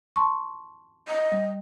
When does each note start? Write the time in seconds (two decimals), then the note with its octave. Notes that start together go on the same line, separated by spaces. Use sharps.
0.16 A5 C6 C#6
1.08 D#5
1.32 G3